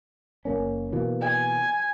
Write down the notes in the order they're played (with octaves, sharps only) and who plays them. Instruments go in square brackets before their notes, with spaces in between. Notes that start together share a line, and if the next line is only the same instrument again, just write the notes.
[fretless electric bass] F#1 A#3 C#4
B2 E3 A#3
[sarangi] G#5